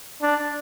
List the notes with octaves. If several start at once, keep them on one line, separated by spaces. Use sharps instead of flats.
D4